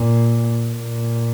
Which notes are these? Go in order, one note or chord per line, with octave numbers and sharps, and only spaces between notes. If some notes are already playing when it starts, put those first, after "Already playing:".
Already playing: A#2
A#2